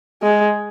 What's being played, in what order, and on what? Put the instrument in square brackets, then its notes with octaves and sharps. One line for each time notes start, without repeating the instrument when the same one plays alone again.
[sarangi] G#3